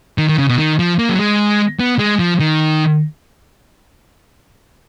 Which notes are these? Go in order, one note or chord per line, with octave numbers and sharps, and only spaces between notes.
D#3
D#3
C#3
B2
D#3
F3
A#3
F#3
G#3
B3
G#3
F3
D#3